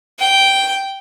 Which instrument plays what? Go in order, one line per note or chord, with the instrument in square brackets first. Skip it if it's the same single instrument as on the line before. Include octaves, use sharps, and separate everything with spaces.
[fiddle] G5